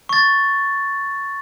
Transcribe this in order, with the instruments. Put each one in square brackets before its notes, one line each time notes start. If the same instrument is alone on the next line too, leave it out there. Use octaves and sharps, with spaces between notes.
[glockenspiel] C#6 A6